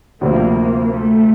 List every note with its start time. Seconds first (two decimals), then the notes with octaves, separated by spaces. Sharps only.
0.21 D2 C3 F3 A#3 C4
0.94 A3